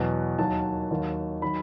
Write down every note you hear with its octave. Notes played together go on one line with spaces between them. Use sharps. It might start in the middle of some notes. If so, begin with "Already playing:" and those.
Already playing: E2 B2 F#3
D#2 D#3 F#3 A5
D#2 D#3 F#3
D#3 F#3 B5